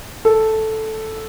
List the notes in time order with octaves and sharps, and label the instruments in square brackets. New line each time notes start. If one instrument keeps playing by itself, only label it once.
[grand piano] A4